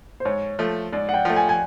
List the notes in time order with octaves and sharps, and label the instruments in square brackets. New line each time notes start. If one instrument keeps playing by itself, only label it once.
[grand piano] C5
[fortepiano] G#2 [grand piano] C#5
[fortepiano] F3 A3
[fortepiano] G#2 [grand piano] D5
[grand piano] F#5
G5
[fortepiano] F3 A3
[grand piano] G#5
G#5